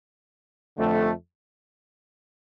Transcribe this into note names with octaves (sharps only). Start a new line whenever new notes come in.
F2 D3 A3